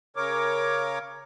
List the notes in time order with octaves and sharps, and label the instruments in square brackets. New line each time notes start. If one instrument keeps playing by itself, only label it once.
[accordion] C#3 A#4 C#5 D6